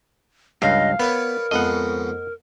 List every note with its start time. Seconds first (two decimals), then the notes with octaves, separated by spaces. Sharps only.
0.62 C#2 G2 D#5 F5
0.99 B3 A#4 B4 C#5 D5
1.51 F2 G#2 B3 D#5 F#5